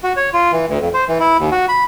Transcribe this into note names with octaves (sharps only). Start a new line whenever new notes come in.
F#4
C#5
F4
E3
D2
F2
C5
E3
E4
D#2
F#4
B5